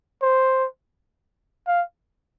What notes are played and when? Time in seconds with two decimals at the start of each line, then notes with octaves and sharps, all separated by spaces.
0.22 C5
1.67 F5